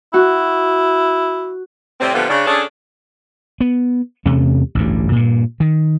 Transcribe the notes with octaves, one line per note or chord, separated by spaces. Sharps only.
E4 F#4
A2 C3 G3 C4
A#2 D3 F3 G3 A3 B3
C#3 D4
C#3 C#4 D4 G#4 A4
B3
E2 C3 A3 C#4
A1 D2 G2
G2 A#2
D#3